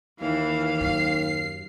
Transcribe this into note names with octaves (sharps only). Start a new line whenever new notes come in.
D#2 E3 F5
F#2 C7